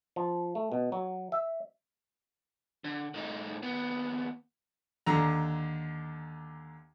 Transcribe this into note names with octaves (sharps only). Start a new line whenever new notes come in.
F3
A3
B2
F#3
E5
D3
A2 D#4
D#2 B3
D#2 D3 A#5